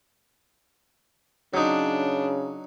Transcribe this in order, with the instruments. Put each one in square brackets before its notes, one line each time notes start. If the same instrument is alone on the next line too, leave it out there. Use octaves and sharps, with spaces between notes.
[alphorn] C#3 [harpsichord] F#3 D#4 [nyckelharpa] D4